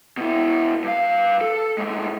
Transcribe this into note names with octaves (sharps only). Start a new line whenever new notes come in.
B2 E4
G2 F5
A4
A2 G#3